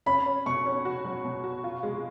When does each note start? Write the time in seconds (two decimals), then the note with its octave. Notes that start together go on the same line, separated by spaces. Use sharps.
0.06 C#4 B5
0.26 C#4
0.46 B2 C#6
0.66 C#4
0.85 F#4
1.05 F#3
1.24 B2
1.44 F#4
1.64 F4
1.83 G#3